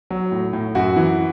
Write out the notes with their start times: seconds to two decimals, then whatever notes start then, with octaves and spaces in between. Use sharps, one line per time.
0.11 F#3
0.32 A2
0.53 A2
0.75 F#2 F#4
0.96 E3